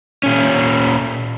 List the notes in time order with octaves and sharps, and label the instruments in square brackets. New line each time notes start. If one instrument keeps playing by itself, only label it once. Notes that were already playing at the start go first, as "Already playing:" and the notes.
[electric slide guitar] A#2 C#4